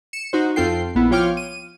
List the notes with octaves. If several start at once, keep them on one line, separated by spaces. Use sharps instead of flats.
C#7 E7
D#4 F#4 C5
F2 C4 F4 A4 G5 C7
A#1 B3 E4
F3 F4 C#5 G5 D6 F6
D#7